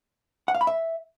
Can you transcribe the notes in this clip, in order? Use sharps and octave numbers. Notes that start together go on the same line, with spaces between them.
F#5
F5
B5
E5